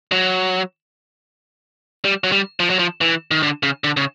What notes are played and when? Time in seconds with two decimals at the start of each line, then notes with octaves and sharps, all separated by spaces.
0.12 F#3
2.05 G3
2.24 F#3
2.32 G3
2.60 F3
2.70 F#3
2.79 F3
3.01 E3
3.31 D#3
3.43 D3
3.63 C#3
3.84 D3
3.97 C#3